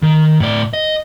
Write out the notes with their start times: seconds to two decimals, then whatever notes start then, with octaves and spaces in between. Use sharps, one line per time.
0.03 D#3
0.40 A2 D5
0.73 D#5